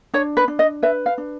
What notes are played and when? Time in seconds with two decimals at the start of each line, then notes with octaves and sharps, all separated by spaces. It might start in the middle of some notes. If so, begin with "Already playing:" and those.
0.14 D4 C#5
0.37 B4
0.48 D4
0.59 D#5
0.83 B4 E5
1.06 F5
1.18 D4